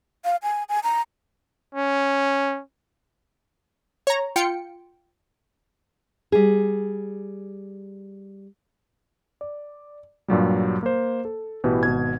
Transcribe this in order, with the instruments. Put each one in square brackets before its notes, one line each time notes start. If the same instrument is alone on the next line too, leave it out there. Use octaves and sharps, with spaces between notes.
[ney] F5
G#5
G#5
A#5
[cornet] C#4
[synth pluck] C#5 A#5
F4 G5 C#7
[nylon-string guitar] G3 G#4
[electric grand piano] D5
G2 A#2 F#3 G3
A#3 C5
A4
A1 B2 E3 G4 B4
G#1 B2 G#6